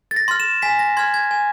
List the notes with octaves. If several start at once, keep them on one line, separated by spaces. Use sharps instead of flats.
A6
A#6
C6 F6
E7
G#5 B6
A#6
C6 F6 G#6
G#6
G#5